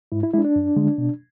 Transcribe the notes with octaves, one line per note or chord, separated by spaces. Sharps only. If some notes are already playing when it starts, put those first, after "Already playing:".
G#2 E4
E4
G#3 D4 E4
D4
F#2
D3 G#3
B2